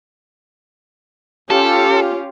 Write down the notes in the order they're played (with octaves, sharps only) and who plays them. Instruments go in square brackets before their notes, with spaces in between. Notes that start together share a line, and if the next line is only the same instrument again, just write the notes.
[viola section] C#4 F4 G4 [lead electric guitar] A4